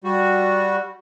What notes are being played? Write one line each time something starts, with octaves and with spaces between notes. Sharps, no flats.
G3 F#4